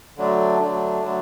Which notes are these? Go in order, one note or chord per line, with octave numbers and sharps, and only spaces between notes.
D3 F#3 A3 D4
D3 F#3 A3 D4
D3 F#3 A3 D4